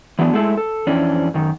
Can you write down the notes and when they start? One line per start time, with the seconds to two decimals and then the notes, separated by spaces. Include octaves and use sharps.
0.19 E3 F#3 B3 D4
0.33 G#3 A3 E4 G#4 A4
0.57 A4
0.87 F2 E3 C#4 D4
1.34 F#2 D#3